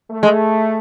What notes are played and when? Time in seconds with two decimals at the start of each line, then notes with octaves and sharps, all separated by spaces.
0.11 A3
0.23 G#3